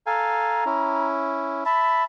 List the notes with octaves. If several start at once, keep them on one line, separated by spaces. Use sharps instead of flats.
A4 F5 G#5 A#5
C#4 E4
E5 A5 B5